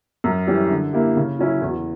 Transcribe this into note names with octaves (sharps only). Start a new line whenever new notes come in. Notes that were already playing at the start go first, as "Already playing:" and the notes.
F#2
E3 G3 C#4 G4
D3
A#3 E4 G4
C#3
F#3 C#4 E4
E2